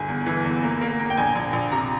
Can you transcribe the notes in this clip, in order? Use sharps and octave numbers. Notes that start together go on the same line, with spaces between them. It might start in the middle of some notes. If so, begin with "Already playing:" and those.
Already playing: G1 G#5
E2
E3
E2
A#3
A#3
A#3
G5
A#1 G#5
A#1
A#1
C3 A#5